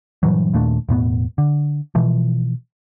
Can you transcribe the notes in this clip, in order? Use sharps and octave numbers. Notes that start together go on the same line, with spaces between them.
G2 A#2 E3 F#3
D#2 A#2 A3 D4
E1 A2 A#3 B3
D3
B2 E3 F3